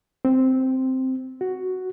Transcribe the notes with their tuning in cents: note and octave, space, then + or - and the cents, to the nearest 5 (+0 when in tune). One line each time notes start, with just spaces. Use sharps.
C4 -5
F#4 +5